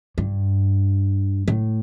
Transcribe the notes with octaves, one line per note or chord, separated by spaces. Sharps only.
G2
A2